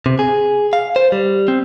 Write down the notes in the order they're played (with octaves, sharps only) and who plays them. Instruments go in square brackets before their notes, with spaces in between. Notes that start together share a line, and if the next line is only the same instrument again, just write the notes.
[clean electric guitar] C3
G#4
F5
C5
G3
C4